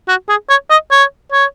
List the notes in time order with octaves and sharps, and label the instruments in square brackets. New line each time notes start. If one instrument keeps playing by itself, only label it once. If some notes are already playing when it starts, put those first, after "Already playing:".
[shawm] F#4
G#4
C#5
D#5
C#5
C#5